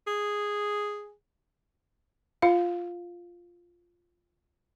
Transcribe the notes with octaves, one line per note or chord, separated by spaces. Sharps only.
G#4
F4 F5